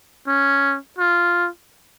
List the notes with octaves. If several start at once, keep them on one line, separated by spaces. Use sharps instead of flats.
C#4
F4